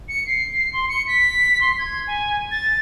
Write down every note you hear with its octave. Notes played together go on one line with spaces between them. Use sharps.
C#7
C7
C6
C#7
B6
C6
G#6
G#5
A6